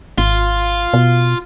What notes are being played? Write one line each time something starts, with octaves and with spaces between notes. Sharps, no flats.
G#1 F4
B2